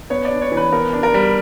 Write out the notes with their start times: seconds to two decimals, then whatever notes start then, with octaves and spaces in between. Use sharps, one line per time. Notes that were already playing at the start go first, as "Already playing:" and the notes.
0.10 B3 C#5
0.25 D5
0.30 D4
0.41 C#5
0.52 E3
0.57 B4
0.72 B3 A#4
0.93 D4
1.03 A#4
1.14 G3